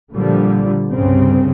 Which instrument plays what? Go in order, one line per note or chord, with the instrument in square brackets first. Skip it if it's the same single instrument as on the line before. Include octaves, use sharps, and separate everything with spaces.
[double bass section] A#2 D3 F3 G3
C2 G2 C#3 C4